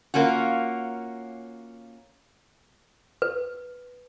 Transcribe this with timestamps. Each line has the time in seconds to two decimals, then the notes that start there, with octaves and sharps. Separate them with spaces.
0.14 A#3 C#4 F4 F#4
3.22 B4